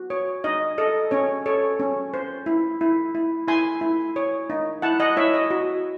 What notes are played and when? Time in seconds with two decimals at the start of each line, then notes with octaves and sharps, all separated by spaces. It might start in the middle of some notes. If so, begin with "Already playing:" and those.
Already playing: F#4
0.10 C#5
0.44 D#4 D#5
0.78 A4 D#5
1.11 C#4 C#5
1.46 A4 C#5
1.79 C#4
2.14 C5
2.46 E4
2.81 E4
3.15 E4
3.48 E4 G#5 C6
3.81 E4
4.16 C#5
4.50 D#4
4.82 E4 F#5 A5
5.00 D#5 F#5
5.17 E4 C#5 E5
5.34 D#5
5.51 F#4